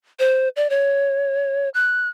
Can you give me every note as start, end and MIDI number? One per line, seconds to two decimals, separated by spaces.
0.19 0.49 72
0.56 0.69 74
0.70 1.69 73
1.74 2.08 90